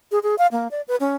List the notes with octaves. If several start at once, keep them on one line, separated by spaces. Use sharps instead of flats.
G#4
G#4
F5
A#3
D5
B4
C#4